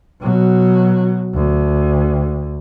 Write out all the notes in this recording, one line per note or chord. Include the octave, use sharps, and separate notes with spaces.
B2 F#3
D2